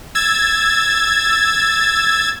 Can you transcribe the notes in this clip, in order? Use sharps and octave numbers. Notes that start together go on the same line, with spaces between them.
E6 G#6 A6